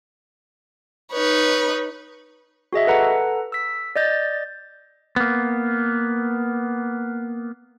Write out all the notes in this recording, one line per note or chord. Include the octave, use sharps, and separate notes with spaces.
D#4 B4 C#5
F#4 G#4 D#5 E5
A4 B4 F#5 A#5
E6 B6
D5 D#5 G6 A6
A#3 B3